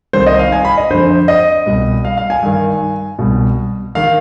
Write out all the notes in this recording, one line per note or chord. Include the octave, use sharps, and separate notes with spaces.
C2 C3 D#3 C5
D#5
F5
G#5
B5
D#5
F2 D3 C5
D#5
C2 B2
F5
F5
G#5
G2 D#3
C2 B2
D#3 F5